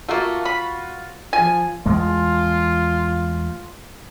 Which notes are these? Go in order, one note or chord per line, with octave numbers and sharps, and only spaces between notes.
A3 A#3 F4 F#4 F5
B5
F3 F4 G#5
E2 G#3 A3 F4